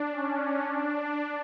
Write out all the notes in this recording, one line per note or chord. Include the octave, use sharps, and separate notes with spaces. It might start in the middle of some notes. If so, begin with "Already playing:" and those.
Already playing: D4
C#4
D4